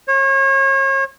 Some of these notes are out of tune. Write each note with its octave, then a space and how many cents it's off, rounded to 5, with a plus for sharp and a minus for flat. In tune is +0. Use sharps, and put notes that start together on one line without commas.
C#5 -35